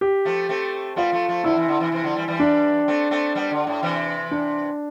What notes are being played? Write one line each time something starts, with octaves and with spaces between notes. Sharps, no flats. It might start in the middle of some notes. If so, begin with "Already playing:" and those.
G4
F3 A3
A3 C4
G3 B3 F4
F3 A3
F3 A3
D3 F3 E4
C3 E3
D3
C3 E3
C3 E3
D3 F3
E3 G3
E3 G3
D4
A3 C4
A3 C4
G3 B3
D3
A2
C3 E3
D4